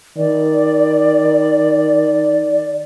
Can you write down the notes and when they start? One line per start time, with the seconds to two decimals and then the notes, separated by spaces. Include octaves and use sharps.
0.17 D#3 D5